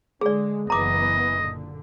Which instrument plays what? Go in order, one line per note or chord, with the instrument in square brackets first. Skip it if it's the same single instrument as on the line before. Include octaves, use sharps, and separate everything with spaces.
[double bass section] D3 G#3 [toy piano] G#4 D5
[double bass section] F#1 E3 B3 [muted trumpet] D#5 [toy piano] A#5 D6
[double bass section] A#2 D3